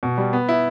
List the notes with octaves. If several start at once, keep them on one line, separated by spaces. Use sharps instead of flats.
B2
G3
B3
E4